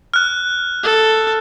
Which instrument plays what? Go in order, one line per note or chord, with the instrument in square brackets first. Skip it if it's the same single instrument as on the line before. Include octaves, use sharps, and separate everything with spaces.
[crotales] F6 F#6
[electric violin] A4